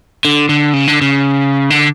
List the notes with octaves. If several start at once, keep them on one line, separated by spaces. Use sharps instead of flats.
D3
D3
C#3
D3
C#3
D3